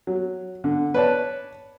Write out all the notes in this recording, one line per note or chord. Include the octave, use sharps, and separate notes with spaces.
F#3
D3
B4 C#5 D5 A5